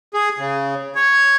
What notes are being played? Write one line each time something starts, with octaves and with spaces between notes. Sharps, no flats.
G#4
C#3
C#5